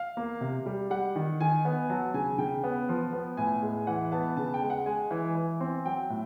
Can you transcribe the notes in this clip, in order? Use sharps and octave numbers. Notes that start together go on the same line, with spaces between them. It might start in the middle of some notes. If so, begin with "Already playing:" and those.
Already playing: F5
A#3
C3
G3
G3 F#5
D#3
D#3 G#5
B3
F#3 A5
C#3 G#5
C#3 G5
B3
F3
B3
A2 G#5
G#3
E3 F#5
B3 A5
C#3 A5
G5
G#3
F#5
G#3 G#5
E3
E3
C4
F#3 G5
A2